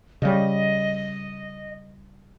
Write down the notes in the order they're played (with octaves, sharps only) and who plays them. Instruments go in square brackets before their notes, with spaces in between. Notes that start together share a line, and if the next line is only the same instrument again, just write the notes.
[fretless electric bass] C#3 G3 [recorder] D#5